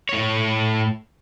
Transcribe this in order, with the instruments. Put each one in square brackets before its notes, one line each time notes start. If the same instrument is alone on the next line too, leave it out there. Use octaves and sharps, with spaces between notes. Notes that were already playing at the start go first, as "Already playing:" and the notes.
[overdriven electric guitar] A2 C#5